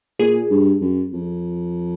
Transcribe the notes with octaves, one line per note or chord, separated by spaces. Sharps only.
A#2 G#4
G2
F#2
F2